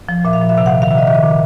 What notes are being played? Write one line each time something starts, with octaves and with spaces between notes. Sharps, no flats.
F3
A#2 E5
F5
F3
E5
C3 F5
F#5
D#3
F5
C3 E5
D#5
D#3 E5
D#5
A#2